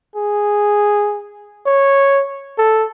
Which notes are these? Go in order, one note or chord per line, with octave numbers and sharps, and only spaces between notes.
G#4
C#5
A4